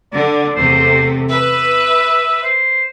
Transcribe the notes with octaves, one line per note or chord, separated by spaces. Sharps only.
D3 D5
E2 C3 A3 C5
B4 E5
C5